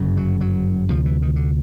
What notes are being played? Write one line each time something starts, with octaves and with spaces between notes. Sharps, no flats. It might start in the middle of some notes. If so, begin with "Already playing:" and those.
Already playing: G1 F#2 C#3
F#3
F#3
D2 C3 F3
E3
D#3
D3